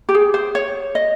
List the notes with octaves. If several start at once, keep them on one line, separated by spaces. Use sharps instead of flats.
G4
G#4
C5
C#5
D#5